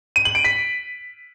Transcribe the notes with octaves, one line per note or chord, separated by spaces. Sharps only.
D#7
F#7
D7
B6